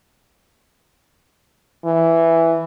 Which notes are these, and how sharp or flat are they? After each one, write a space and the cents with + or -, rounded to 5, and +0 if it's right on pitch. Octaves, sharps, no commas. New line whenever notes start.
E3 +0